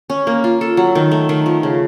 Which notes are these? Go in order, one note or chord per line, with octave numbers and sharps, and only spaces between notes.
C#4
A#3
F4
A4
F#3
D#3
A3
D#3
F3
C#3